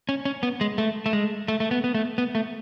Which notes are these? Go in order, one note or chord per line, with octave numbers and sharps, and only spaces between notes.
C#4
C#4
B3
G#3
A3
A3
G#3
A3
A3
B3
B3
A3
B3
A3